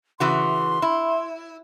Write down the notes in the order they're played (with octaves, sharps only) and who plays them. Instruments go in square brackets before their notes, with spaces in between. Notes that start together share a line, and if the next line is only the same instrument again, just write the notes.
[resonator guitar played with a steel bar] C#3 E3 F#4 [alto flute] C6
[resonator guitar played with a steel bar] E4